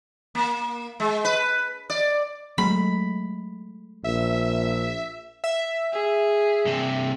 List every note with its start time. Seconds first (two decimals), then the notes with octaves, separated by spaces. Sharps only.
0.35 A#3
1.00 G#3
1.25 B4
1.90 D5
2.58 F#3 G#3 A3 B5
4.04 A#1 E5
5.44 E5
5.92 G#4
6.65 G2 C3